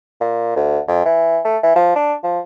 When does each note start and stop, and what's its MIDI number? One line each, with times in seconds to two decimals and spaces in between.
0.21 0.56 46
0.56 0.79 38
0.88 1.03 41
1.05 1.39 52
1.45 1.57 57
1.63 1.75 52
1.76 1.94 53
1.96 2.14 62
2.23 2.39 53